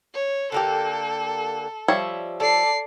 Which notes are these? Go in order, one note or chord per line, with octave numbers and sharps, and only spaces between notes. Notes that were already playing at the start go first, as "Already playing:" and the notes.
C#5
D3 A#3 G4 A4
F3 G3 C#5 E5
A4 D5 C7